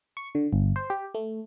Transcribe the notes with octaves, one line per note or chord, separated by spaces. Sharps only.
C#6
D3
G1
C5
G4
A3